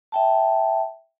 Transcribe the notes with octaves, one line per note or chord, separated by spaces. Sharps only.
E5 G5 A5